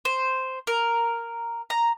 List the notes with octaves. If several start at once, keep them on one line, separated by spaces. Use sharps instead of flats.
C5
A#4
A#5